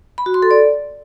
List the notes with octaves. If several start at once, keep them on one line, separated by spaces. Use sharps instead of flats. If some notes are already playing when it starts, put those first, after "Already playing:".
B5
F#4
C6
A4
D5